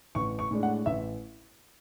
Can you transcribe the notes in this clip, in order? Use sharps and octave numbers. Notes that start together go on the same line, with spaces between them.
A1 C#6
C#6
A2 G#3 D4
F#5
A1 E5